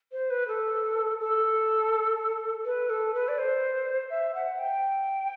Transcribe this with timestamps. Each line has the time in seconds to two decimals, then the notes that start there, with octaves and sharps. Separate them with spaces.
0.12 C5
0.30 B4
0.48 A4
1.20 A4
2.65 B4
2.90 A4
3.14 B4
3.28 D5
3.38 C5
4.10 E5
4.35 F#5
4.59 G5